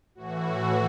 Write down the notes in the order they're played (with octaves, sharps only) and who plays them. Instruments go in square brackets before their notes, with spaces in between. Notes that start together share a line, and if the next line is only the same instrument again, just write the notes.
[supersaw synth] A2 E3 F#4